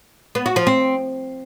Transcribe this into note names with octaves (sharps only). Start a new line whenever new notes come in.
B3
F#4
F3
C4